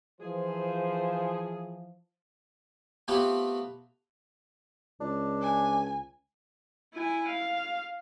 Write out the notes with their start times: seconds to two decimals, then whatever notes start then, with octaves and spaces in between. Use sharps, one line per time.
0.21 E3 F3 G#4 C5
3.08 A3 B3 C4 F4 G4 B4
5.00 C#2 D4
5.42 G#5
6.94 E4 G#5
7.29 F5